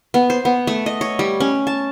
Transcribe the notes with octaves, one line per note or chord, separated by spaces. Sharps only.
B3
C5
B3
A3
D#5
C#5
G3
C#4
A5